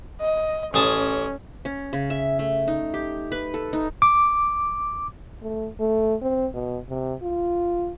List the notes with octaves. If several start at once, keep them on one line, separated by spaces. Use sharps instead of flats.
D#5
A1 C#4 G#4 A5
C#4
C#3
E5
A3
D#4
G4
B4
A4
D#4
D6
A3
A3
C4
B2
C3
F4